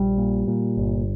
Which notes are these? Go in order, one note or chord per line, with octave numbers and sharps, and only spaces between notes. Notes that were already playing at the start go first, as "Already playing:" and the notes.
Already playing: A#1 G3
A#2
A#2
G1